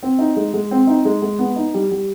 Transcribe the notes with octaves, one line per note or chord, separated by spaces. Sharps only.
C4
D#4
G#3
G#3
C4
D#4
G#3
G#3
B3
D#4
G3
G3